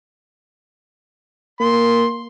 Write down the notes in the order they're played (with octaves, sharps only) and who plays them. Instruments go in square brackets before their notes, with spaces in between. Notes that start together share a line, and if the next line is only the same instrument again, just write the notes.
[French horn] A#3 [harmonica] C6